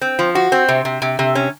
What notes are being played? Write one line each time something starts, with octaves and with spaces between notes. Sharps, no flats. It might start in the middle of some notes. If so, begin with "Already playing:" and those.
C4
F3
F#4
C4
C3
C3
C3
C3
C#4